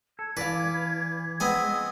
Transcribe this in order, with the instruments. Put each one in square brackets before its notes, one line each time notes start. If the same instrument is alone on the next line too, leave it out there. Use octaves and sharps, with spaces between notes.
[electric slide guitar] A4 [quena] G#6
[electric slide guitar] E3 [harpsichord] B4 [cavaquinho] D5 F5
[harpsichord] B3 C4 G#5 [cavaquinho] G#4 D#5